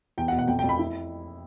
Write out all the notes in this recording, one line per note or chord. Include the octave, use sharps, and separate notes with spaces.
E2 G5
F#5
B2
F#5
F2 G5
G5
F2
B5
E4